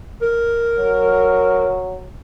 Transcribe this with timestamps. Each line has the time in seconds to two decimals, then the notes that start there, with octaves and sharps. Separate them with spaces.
0.22 A#4
0.78 F#3